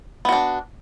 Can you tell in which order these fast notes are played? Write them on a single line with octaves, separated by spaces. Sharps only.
B3 F#4 D4